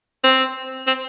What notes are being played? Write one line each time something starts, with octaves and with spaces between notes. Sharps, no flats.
C4
C4